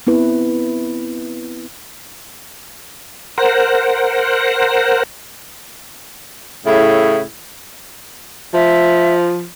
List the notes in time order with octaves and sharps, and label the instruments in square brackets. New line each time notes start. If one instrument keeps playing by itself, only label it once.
[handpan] B3 C4 E4 B4
[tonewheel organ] A#4 C5 F#5
[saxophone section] A2 C#3 E4
[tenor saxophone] F3 [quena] E5